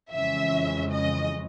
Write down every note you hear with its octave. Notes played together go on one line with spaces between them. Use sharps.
F2 C#3 E3 G#3 C#4 E5
D#5